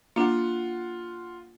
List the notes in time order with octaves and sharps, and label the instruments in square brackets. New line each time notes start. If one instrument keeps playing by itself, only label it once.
[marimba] A#3 D4 [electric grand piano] F4 F#5